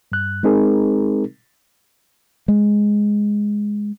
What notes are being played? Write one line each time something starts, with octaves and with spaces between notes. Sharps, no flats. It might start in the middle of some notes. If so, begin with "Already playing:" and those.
G2 F#6
G#3 C4 D#4 G#4 A#4
G#3